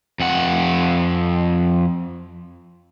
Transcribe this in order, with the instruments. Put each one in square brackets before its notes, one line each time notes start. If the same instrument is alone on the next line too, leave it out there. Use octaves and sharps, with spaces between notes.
[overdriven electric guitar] F2 F#5